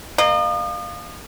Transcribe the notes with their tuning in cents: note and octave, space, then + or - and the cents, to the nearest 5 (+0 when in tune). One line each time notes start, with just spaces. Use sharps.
A#3 +0 D#5 -40